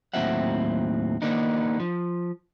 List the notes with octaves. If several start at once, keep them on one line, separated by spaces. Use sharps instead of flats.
D#2 A2 F#3 C4 E5 F#5
D#3 A#3 B3 D4 D#4
F3